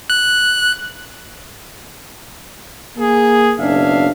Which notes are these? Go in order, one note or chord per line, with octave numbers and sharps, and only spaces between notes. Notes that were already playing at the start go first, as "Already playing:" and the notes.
F#6
A#3 G#4
F#1 B2 D4 E5 F5